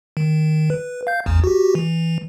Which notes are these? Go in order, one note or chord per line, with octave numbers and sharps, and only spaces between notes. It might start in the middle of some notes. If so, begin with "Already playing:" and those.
D#3
B4
F5 G6
A1 E2
F#4 G4
E3